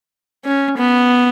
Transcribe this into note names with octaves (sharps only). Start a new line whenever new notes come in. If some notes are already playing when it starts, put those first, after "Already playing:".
C#4
B3